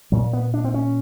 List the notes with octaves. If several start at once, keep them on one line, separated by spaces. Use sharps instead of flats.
A#2 F#3
B3
D4
C4
C#4